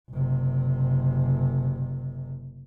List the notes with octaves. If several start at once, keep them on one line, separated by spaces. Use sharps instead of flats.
F#1 C3